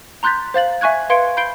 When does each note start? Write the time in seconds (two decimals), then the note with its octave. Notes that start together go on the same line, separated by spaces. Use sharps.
0.23 A#5 C6 F#6 G6 A6 B6
0.54 C5 F5 A6 F#7
0.81 E5 G#5 C#6 F#6 G#6
1.10 B4 F5 C6 G#6 C#7 D7
1.37 B5 G6 C7 D7 G7